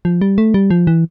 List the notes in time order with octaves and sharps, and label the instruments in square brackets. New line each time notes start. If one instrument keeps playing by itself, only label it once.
[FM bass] F3
G3
A3
G3
F3
E3